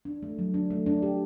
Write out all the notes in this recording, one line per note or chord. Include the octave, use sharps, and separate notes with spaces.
D4
A3
F#3
D4
A3
D4
G4